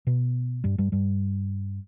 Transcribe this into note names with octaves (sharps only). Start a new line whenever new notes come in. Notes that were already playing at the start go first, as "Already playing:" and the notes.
B2 B3
G2 G3
G2 G3
G2 G3